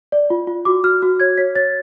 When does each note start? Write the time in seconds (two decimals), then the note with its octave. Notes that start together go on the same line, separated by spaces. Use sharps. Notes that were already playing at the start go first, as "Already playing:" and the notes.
0.12 D5
0.30 F4
0.47 F4
0.65 F#4 D6
0.83 F#4 F6
1.02 F#4 F6
1.20 C#5 G#6
1.38 C#5 B6
1.56 C#5 A6